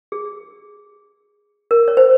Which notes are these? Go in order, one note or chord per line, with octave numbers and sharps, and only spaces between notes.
G#4
A#4
C#5
C5